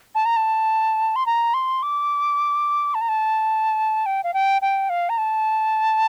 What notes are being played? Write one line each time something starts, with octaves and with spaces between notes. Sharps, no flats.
A5
A#5
A5
C6
A#5
C6
D6
A5
A#5
A5
G5
F5
G5
G5
F5
A#5
A5